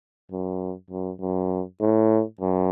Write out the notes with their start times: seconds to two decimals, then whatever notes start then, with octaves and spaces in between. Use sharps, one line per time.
0.31 F#2
0.90 F#2
1.21 F#2
1.81 A2
2.41 F#2